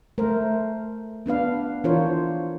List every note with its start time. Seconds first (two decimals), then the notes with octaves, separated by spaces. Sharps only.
0.18 A3 A#4 C5
1.26 B3 D4 B4 F5
1.84 E3 D4 F4 A#4 C5 C#5